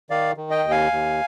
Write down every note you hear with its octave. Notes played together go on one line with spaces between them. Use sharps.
D#3 D5 F5
D#3
D#5 G5
D#2
F5 G#5
D#2